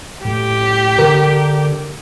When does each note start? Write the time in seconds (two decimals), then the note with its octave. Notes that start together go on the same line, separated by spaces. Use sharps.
0.25 A2 G4
0.99 D3 A#4